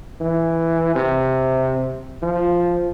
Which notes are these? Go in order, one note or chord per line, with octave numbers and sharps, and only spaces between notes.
E3
C3
F3